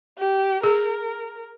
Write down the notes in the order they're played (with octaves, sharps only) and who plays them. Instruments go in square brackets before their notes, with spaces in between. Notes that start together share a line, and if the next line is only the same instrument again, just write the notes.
[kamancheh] G4
[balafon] G#4 [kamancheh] A#4